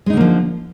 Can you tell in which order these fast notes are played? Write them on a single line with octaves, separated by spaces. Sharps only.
G#3 D#4 D3 A#3 F3